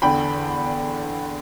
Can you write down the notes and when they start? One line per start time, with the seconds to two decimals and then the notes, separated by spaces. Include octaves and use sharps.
0.02 E2 D3 G5 B5